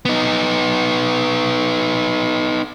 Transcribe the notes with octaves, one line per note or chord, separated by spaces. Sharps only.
B3 D#4